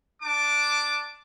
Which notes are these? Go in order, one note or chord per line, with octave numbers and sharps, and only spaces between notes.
D4 A5 D6